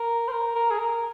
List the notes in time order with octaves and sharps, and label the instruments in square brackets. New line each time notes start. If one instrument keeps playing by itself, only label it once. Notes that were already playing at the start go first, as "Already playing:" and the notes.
Already playing: [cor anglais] A#4
C5
A#4
A#4
G#4
A#4